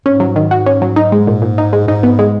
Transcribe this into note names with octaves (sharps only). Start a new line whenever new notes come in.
G#2 C#4
F#3
D#3
F#4
C#4
F#3
D#4
G#3
A#2
A#2
D#4
G#3
G#2 D#4
B3
G#3